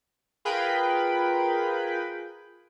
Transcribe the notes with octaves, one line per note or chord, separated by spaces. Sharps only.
F4 G#4 A#4 B4 G5 B5